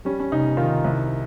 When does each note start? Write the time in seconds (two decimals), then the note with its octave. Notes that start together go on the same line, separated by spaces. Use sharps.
0.05 G3 C#4
0.20 C#4
0.31 F1 D#4
0.57 D#3 F4
0.84 C2